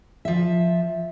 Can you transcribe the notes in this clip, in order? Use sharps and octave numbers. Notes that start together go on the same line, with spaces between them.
F3 E5